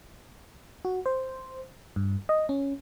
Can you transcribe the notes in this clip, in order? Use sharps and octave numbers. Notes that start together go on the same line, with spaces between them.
F#4
C5
G2
D#5
C#4